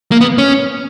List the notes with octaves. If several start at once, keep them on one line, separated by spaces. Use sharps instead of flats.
A#3
B3
C#4